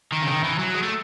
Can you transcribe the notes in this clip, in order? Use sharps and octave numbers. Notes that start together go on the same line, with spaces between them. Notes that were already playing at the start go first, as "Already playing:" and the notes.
D#3
C#3
D#3
E3
F#3
G#3
A3